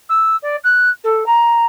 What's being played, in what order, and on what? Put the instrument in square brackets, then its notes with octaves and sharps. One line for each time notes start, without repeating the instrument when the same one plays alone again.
[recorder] E6
D5
F#6
A4
A#5